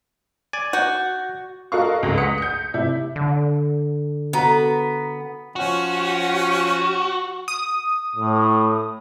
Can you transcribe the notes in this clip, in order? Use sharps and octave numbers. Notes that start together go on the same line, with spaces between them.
D5 G#5
F#4 G6
F#4 A4 A#4 D#5 F5 C#6
C#2 G#3 A#6
F#5 D#6 B6 C#7
G6 C#7
C3 E4
D3
B3 F#4 A4 B4 A#5
F3 C#4 F#4
D#6
A2